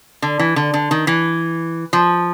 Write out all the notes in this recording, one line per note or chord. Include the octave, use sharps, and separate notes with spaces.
D3
E3
D3
D3
D#3
E3
F3